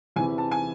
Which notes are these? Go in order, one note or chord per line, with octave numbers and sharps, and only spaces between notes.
E2 C3 E3 G#5
A5
G#5